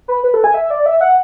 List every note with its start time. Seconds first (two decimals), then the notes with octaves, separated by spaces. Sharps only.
0.08 B4
0.24 B4
0.34 A4
0.44 G#5
0.54 E5
0.70 D5
0.86 E5
1.01 F#5